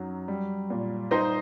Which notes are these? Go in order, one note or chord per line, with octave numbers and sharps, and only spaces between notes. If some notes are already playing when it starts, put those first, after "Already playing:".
Already playing: F#2 F#3 D#4
G3
A#2
D#4 C5 D#5